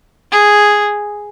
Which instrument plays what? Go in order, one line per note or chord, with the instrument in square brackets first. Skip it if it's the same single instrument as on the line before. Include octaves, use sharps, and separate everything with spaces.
[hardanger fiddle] G#4